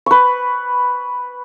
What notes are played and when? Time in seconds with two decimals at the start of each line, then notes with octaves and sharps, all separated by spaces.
0.06 B4 C#6